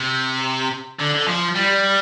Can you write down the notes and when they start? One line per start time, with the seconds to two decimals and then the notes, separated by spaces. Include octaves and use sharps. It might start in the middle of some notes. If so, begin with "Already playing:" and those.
Already playing: C3
1.00 D3
1.15 D3
1.27 F3
1.55 G3